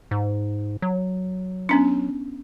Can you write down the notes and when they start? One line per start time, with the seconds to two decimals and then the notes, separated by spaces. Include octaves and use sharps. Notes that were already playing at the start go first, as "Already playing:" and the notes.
0.11 G#2
0.82 F#3
1.69 B3 C#4 D4